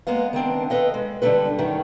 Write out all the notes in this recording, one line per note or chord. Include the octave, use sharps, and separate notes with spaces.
G#3 A#3 B3 F5
D#3 B3 C4 D4
A4 B4 D#5 F5
G#3
D3 G3 D4 D#4 A4 B4
F#2 A2 D#3